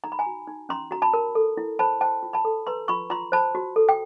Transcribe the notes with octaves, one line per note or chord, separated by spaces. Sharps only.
D#4 A#5
B5
G#5 A#5
F#4
D#4
C#4 A#5 C6
F#4 A#5
A5 B5
A#4
A4
E4
C5 A5 B5
C5 G5 A5
F4
A5 B5
A4
B4 A#5 C6
F4 B5 C#6
F4 A#5 C6
C5 A5 B5
F#4
A4
G5